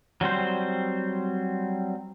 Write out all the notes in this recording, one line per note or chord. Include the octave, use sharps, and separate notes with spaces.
F#3 G3 C4 C5